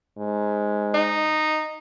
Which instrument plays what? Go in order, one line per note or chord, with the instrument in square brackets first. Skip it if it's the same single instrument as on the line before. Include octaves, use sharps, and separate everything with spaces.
[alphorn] G#2
[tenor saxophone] D#4